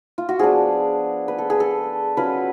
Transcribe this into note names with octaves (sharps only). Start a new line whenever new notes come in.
F4
F#4
F3 B3 D4 G#4
B4
A4
G#4
A4
F#3 C#4 F4 B4